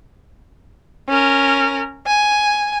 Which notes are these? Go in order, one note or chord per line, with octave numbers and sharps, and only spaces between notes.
C#4 A#4
G#5